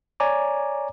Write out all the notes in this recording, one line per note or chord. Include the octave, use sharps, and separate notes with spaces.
C#5 D5 G#5 A#5 D6